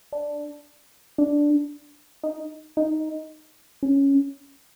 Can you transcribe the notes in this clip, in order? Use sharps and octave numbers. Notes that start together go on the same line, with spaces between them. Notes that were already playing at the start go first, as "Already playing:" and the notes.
D4
D4
D#4
D#4
C#4